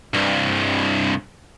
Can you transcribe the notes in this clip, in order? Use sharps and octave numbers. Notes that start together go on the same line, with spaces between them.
C2 G2